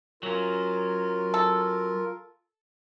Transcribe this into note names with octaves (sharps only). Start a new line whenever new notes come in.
F#3 C#4 F4 A#4
A4